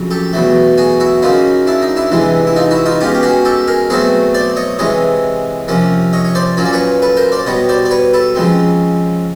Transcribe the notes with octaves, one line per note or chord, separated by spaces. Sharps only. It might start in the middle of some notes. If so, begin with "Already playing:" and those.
Already playing: F2 C#3 F#3
G4 A4
E2 B2 F#3 A3
F#4 G#4
E4 F#4
C#3 F#3 A#3 C#4 D#4 F4
D4 E4
D#4
D4 E4
E2 C3 E3 G#3
E4
D#4 F4
E4 F#4
D#4 F4
B2 G#3 C#4 F4 G4
G4
F#4 G#4
G4 A4
G#4 A#4
B2 F#3 A3 C4 F#4 G#4
C5 D5
C#5 D#5
C3 E3 G#3 C#5 D#5
C3 F3 A#3 C#4
C#5 D#5
C#5
C5 D5
A#2 F#3 A#3 C#4 C#5
D5
B4 C#5
A4 B4
A#4 C5
C5 D5
B2 G3 B3 C#5 D#5
C5 D5
D5
B4 C#5
A4 B4
C#3 F3 G#3 C4